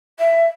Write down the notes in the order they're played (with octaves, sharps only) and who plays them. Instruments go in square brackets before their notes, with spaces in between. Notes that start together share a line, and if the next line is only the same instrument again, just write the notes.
[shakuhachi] E5